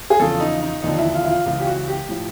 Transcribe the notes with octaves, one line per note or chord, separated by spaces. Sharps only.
G#4
E2 C#3 F3 A4
D#4
D#4
E1 D#2 D3 F3 D#4
E4
F4
E4
F4
C#2 C#3 E3 F4
G4
F#4
G4
A2 F3